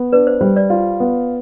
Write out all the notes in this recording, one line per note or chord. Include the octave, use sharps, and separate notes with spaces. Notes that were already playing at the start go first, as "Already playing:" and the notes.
Already playing: B3
D4 B4
C5
G3 C5
D5
F4
B3